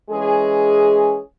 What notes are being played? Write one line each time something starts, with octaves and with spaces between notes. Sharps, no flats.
E3 G#3 C#4 G#4